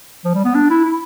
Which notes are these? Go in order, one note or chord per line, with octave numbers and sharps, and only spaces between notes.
F3
G3
B3
D4
E4
E4